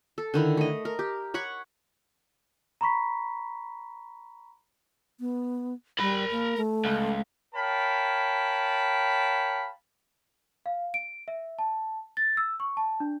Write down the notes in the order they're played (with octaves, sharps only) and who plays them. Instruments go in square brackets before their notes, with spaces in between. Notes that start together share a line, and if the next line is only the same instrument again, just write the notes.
[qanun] A4
D3 D#3 E4
A3 D#5
A#4
G4
C#5 F#5 B5 C#6
[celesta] A#5 B5 C#6 B6
[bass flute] B3
[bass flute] G3 [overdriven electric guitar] A#4 B5
[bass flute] A#3
A3
[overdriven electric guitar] C#2
[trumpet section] A#4 C#5 F5 G5 A5 B5
[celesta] F5
D7
E5
A5
A6
E6
C#6
A5
D4